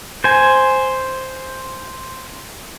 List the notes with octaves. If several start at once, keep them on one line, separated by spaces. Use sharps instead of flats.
C5 G#5